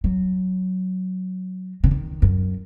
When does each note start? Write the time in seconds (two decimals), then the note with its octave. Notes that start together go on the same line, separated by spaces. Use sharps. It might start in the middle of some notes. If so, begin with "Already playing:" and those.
0.04 F#3
1.84 C#3
1.91 D#3
2.22 F#2